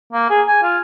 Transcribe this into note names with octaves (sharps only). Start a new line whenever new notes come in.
A#3
G#4
G#5
F4